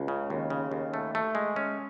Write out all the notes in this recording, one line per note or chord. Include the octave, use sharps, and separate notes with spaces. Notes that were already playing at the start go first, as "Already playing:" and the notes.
Already playing: C#2
C#3
D#2
C#3
D#2
A3
A3
G#3
C#4